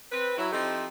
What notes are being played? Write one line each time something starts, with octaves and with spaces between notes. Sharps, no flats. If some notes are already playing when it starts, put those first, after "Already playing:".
C4 B4
F#3 E4
F3 C4 D#4 E4 G4 A4